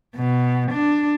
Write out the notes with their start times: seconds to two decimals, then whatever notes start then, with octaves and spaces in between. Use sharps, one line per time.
0.16 B2
0.72 D4